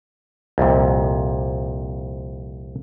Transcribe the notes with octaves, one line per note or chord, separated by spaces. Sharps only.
C2 F2 A#2